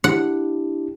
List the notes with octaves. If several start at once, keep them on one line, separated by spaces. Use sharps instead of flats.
D4 E4 G4 F#5